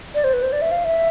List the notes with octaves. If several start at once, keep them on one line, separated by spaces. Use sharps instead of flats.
D5
C5
B4
C5
D5
E5
F5
E5